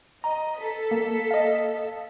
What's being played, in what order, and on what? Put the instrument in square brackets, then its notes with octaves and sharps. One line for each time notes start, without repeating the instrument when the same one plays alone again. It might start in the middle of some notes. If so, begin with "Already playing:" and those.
[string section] D#5 [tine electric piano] A#5
[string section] A4 B6
[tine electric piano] A#3
D#5 F5